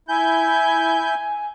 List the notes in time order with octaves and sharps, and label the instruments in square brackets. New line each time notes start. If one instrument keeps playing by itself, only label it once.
[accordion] E4 G6 [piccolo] G#5